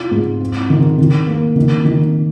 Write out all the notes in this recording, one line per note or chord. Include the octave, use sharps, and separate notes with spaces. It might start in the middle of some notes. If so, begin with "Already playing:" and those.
Already playing: C3 F4
G#2
C4
D#3
D#3
A#3
D#3
D#3